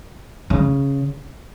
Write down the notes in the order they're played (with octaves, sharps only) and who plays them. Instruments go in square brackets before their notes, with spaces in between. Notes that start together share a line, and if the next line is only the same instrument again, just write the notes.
[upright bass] C#3